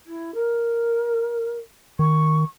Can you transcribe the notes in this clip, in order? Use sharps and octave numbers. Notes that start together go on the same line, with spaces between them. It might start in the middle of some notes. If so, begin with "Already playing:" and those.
E4
A#4
D#3 C#6